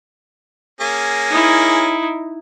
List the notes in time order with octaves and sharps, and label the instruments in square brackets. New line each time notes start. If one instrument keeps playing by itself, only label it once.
[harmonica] A#3 C#4 G#4
[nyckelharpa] D#4 E4